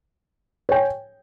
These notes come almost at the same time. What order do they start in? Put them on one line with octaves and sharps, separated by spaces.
C#5 G5 G#5